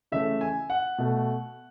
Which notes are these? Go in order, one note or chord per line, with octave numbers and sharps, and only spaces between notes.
C#3 E3 A3 E5
G#5
F#5
B2 A3